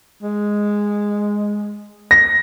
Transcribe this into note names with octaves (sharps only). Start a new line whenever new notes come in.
G#3
A#6